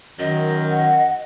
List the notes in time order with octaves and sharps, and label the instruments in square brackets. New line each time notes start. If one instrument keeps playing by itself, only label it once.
[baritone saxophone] F#2 [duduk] D#3 [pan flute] D#5
[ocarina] F#5